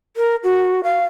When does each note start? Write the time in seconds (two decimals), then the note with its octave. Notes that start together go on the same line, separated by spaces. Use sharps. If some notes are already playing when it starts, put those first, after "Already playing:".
0.17 A#4
0.44 F#4
0.84 F5